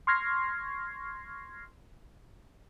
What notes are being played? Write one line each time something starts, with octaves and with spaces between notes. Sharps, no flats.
C6 C#6 F6 G#6 A#6 C7